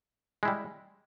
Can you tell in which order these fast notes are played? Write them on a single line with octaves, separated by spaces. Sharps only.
G#3 E4 G3